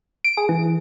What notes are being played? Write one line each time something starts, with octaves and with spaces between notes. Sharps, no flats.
D7
G#4
E3